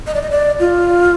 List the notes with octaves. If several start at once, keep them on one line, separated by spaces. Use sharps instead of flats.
D#5
D5
D#5
D5
F4